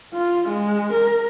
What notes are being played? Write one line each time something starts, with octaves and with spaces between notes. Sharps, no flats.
F4
G#3
A#4